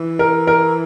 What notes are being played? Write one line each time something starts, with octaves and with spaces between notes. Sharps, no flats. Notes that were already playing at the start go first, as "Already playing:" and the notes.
Already playing: E3
A#4
A#4